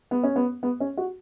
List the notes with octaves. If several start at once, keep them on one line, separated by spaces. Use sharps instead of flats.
B3
C#4
B3
B3
C#4
F#4